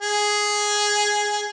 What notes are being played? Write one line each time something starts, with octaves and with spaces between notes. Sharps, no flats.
G#4